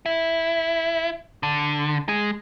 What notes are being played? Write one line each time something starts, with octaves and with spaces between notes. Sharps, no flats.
E4
D3
G#3